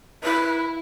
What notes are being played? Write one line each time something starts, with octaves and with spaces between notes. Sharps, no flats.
E4 B4